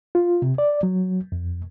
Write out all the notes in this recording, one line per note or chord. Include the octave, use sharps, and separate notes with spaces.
F4
C3
D5
F#3
F2